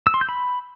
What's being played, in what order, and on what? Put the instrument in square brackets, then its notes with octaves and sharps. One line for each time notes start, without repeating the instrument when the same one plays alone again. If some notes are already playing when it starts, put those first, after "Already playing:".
[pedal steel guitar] E6
C6
G6
B5